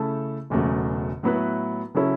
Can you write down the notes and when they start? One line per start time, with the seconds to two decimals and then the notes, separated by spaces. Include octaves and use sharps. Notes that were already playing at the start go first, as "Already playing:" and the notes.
Already playing: C#3 A3 E4 A4
0.50 E1 E2 C#3 F#3 A3
1.23 A2 F#3 B3 E4 B4
1.94 C#3 F#3 C#4 E4 A4